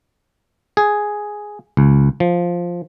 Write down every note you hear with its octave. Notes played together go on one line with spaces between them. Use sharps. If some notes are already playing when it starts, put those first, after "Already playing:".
G#4
C#2
F3